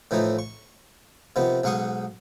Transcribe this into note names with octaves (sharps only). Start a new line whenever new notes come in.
A2 E3 F3 A3 D#4
C#6
C3 D#3 F3 B3
B1 G#2 F5 F#5 C#6 D#6